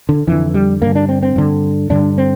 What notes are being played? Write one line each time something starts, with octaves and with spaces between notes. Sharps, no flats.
D3
F2 D3 E3
G3
G2 D3 A#3
D4
C4
C4
G2 D3
G2 D3 D4
C4